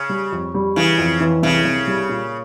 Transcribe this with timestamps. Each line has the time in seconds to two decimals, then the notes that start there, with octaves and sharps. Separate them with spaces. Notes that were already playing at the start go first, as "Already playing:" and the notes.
Already playing: C#3
0.09 G3
0.32 F2
0.54 G3
0.76 C#3 E3
0.99 F2
1.20 E3
1.43 C2 C#3
1.65 C2
1.87 G3
2.09 A#2